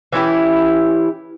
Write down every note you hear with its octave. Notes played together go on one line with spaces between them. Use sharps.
E3 C#4 E4 G4